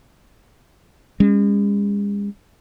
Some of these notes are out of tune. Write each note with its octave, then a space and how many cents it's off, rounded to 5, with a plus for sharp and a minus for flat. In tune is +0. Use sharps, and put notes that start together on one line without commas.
G#3 -40 C#4 +0